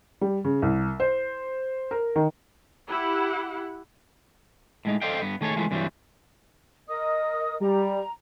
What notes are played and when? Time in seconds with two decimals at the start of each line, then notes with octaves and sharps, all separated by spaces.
0.21 G3
0.44 C#3
0.62 C2
1.00 C5
1.91 A#4
2.16 D#3
2.88 E4 G4 F#5
4.85 A2 G#3 D#4
5.02 A4 C5 D5 D#5 F5 G5
5.22 G2 B3
5.41 D#3 A3 G#4 A4 C#5
5.56 E3 F3 G#3 A3 B3
5.71 G2 C3 E3 F#3 G3
6.88 A#4 D#5 D#6
7.61 G3 A#5